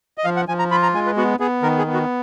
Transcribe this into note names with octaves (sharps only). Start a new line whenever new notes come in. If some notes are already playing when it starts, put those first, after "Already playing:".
D#5
F3 F5
F#5
F3 G#5
A#5
F4 B5
A#5
G#3 G#5
B4
B3 F#4
B3 G#4
D#3 A#4
G#4
B3
F#4